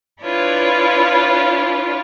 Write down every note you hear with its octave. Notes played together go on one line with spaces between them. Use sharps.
D4 E4 F4 B4 C#5